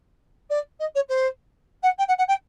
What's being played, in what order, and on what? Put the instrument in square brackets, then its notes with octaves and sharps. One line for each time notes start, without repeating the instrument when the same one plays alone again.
[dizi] D5
D#5
C#5
C5
F#5
G5
F#5
F#5
G5